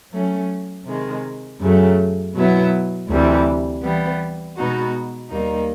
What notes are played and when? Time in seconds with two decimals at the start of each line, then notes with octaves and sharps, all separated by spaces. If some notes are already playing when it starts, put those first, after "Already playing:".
0.12 F#3 A3 C#4
0.87 C3 D#3 G#3
1.60 F#2 C#3 F#3 A3
2.35 B2 F#3 B3 E4
3.09 D2 C3 E3 G3
3.83 E3 G3 B3
4.57 B2 G#3 B3 D#4 F#4
5.31 D#2 D#3 G3 A#3 D#4